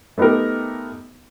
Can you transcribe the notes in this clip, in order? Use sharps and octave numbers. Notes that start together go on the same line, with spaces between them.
A3 B3 D#4 G4 A#4